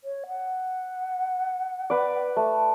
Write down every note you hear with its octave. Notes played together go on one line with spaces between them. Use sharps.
C#5
F#5
B4 D5
A3